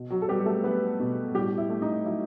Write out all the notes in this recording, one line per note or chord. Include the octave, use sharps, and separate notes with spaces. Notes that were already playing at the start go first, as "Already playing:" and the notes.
Already playing: B2
F#3 F#4
A4
G3 B3 G4
A3 A4
F#3 B3 B4
B2
A2 G3 G4
E4
A3
D#4
F#3 E4